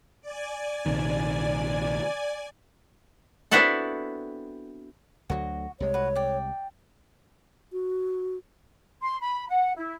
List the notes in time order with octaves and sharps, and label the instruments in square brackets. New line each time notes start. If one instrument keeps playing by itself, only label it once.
[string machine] D5 G#5
[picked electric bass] A#1 C3 D#3
[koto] B3 C4 D4 E4 F#4 A4
[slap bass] D2 D3 F#3 [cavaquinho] F#4 D#5
[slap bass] C2 C3 G#3 [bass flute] C#5
[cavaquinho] F#4 B4
D5 G5
[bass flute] F#4
[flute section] C6
B5
F#5
E4